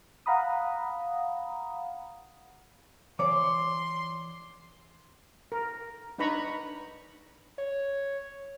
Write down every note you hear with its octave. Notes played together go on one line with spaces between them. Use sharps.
F5 F#5 A#5 B5 D#6
E3 C#5 D5 C6 D6
A#4
D4 D#4 B4 A#5 B5 C#6
C#5